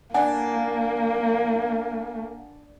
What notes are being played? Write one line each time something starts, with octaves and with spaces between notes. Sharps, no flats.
A#3 D4 F#5 G#5